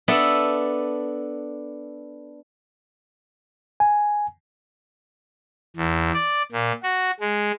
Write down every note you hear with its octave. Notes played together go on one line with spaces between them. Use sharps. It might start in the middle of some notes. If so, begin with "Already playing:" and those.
B3 D4 A4 E5
G#5
E2
D5
A#2
F#4
G#3